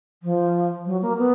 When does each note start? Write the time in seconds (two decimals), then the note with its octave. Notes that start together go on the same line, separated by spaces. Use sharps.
0.23 F3
0.86 F#3
1.02 A#3
1.18 B3